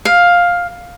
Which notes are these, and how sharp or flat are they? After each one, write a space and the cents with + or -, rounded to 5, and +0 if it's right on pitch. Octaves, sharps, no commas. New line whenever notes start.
F5 +10